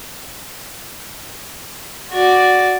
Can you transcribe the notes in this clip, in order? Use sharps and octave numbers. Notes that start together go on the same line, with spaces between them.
F#4 D5